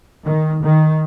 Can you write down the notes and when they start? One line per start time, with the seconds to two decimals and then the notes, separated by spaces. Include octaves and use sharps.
0.25 D#3
0.63 D#3